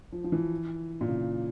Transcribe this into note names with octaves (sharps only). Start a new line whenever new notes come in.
F3
F3
E3
A#2
C#3